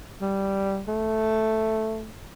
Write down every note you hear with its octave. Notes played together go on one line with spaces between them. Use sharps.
G3
A3